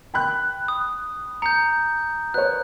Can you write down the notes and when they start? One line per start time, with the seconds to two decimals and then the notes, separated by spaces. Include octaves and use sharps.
0.14 G5 B5 F#6
0.68 D#6
1.42 A#5 G6 C#7
2.34 B4 C#5 F#6